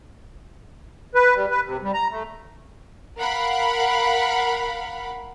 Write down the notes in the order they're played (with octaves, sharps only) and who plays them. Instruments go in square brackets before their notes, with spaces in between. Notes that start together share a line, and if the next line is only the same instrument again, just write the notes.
[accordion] B4
G3
B4
C3
G3
A#5
A3
[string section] A#4 F5 F#5 B5